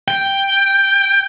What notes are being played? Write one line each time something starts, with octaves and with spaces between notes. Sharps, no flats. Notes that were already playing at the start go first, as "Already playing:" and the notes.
G5